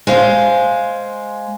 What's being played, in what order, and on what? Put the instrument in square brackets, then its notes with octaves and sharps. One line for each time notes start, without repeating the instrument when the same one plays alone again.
[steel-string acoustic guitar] G#3 C5 F5